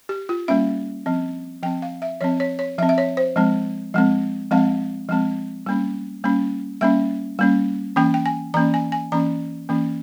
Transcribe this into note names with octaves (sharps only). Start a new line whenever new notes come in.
G4
F4
G3 A#3 C#4 E5
F3 C4
F3 C4 G5
F5
E5
F3 C4 C#5
C#5
C#5
F3 C4 E5
E5
C#5
C5
F3 G#3 C4
F3 G#3 C4
F3 G#3 C4 F5
F3 G#3 C4
G3 A#3 C#4
G3 A#3 C#4
G3 A#3 C#4 E5
G3 A#3 C#4
E3 A#3 C#4 G5
G5
G#5
E3 A#3 C#4 A#5
G#5
G#5
E3 A#3 C#4 A#5
E3 A#3 C#4